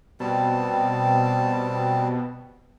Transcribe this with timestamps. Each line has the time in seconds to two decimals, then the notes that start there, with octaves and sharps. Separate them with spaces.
0.20 B2 G3 C4 A5